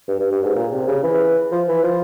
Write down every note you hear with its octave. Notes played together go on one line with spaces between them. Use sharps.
G2
G2
G2
G#2
A#2
C3
C#3
E3
F3
E3
F3